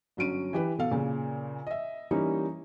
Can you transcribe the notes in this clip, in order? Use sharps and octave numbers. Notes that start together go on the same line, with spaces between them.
G1 F#3 C#4 D7 D#7
E3 G4 B4
B2 A4 F5
A#2 C#3
D#5 E5
E3 G3 A#3 C#4 D#4